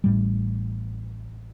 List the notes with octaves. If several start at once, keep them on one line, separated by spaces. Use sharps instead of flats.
A1 A2 G3